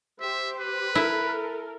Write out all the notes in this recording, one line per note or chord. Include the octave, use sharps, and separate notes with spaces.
G4 C5 E5
B4
E4 A4 A#4